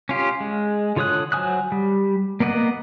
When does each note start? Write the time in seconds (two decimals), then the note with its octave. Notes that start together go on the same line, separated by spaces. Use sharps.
0.09 C#4 F4 G4
0.40 G#3
0.96 D3 F4 C#5 D#6 F#6
1.32 F#3 C5 G#5 D#6 F#6
1.72 G3
2.40 A#3 B3 D5 D#5 F#5